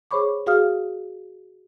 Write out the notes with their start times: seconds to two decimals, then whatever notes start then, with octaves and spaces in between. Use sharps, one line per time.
0.11 G#4 C5 C#5 B5 C#6 D6
0.46 F#4 G#4 F5 D#6 F6